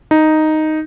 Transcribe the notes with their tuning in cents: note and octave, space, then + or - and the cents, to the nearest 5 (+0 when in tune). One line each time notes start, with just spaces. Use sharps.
D#4 +0